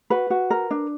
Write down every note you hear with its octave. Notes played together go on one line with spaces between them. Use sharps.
F#4 B4
F#4
A#4
D4